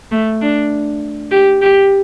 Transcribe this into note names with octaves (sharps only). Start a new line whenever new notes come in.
A3
D4
G4
G4